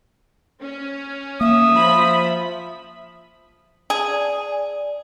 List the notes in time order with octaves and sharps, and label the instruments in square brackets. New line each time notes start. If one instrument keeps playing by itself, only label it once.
[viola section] C#4
[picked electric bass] A#3 [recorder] E5 [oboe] D#6
[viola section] F3 B5
[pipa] G#4
[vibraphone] D5